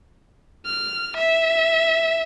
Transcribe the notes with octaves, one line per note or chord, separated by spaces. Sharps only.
F6
E5